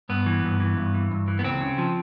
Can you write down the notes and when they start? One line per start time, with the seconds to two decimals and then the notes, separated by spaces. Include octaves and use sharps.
0.09 G2 B3
0.26 E3
0.43 G2
0.60 E3
0.77 G2
0.94 E3
1.11 G2
1.28 E3
1.39 B3
1.44 C#2 C4
1.61 C#3
1.78 F3